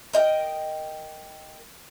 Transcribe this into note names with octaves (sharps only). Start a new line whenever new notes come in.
A#4 D#5 G5